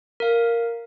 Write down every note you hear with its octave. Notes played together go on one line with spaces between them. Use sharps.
A#4 F5